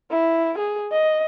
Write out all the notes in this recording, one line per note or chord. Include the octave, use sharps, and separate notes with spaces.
E4
G#4
D#5